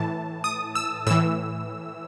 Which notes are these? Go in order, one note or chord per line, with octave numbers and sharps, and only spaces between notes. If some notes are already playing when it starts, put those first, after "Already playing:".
Already playing: A2 E3 A5
D#6
E6
A2 E3 E6